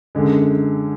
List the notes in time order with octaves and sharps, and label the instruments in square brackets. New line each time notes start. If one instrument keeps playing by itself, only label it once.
[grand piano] F#2 D3 G#3